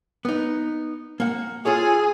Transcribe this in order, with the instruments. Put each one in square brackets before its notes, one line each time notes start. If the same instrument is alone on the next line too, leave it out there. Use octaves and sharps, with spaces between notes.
[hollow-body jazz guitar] B3 D#4
A#3 F#5
[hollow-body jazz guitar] F4 A4 C#5 [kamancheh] G#4 G#5